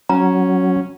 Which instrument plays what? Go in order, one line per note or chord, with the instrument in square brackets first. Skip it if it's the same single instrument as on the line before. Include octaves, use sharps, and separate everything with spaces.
[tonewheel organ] F#3 [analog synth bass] C#4 [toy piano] A#5